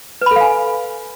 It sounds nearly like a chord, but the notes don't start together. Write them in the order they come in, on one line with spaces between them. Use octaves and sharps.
B4 B5 A4 F5 G#5